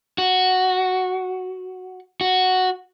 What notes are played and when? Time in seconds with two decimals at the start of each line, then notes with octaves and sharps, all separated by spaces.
0.18 F#4
2.21 F#4